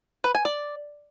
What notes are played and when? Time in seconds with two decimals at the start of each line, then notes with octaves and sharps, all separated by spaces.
0.24 B4
0.35 G#5
0.45 D5